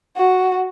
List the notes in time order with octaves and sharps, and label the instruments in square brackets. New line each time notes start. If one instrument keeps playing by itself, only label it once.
[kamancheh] F#4